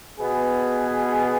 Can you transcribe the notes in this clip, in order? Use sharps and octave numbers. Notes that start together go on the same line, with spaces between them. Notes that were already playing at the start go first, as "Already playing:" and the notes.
B2 B3 G#4